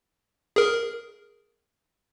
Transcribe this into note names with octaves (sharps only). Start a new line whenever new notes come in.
G#4 A#4